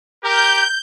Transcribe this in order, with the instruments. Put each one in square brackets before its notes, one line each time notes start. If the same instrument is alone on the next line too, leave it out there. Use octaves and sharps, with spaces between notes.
[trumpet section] G4 A#4 [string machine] G6